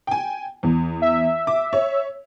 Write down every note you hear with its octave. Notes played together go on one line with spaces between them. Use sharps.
G5 G#5
E2
E5
D6
C#5